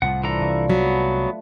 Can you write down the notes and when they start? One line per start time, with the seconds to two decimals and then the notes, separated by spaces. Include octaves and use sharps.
0.02 C2 A2 F3 F4 F#5
0.24 D3 E3 A4 A#5
0.41 C2 G2 F5 C#6
0.70 F#3 B3
0.83 A3